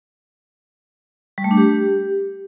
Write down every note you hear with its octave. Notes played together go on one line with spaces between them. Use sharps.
G3
A3
D4
G4